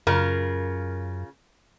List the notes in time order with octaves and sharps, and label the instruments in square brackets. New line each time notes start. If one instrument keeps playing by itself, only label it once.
[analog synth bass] F#2 [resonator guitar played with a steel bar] C#3 F4 A#4